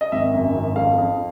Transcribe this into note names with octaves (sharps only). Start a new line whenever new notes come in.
D#5
G#1 E5
F#2
G#1
F2 F5
F2